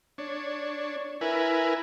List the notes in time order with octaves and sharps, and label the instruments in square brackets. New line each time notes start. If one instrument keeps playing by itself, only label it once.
[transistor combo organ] D4 C#5
E4 A#4 B4 G#5